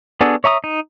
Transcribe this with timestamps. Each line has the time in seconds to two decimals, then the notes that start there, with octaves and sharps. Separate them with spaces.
0.21 B3 D4 F#4 G#4 A4
0.44 C#5 E5 A#5 D#6
0.64 D#4